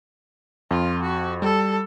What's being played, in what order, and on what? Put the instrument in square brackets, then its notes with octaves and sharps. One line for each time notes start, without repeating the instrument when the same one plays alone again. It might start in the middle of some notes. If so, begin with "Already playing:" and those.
[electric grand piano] F2 [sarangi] F4
[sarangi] F#4
[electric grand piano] G3 [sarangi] A4